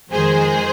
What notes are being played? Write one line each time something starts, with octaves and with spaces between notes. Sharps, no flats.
F2 D#3 G#3 G#4 C5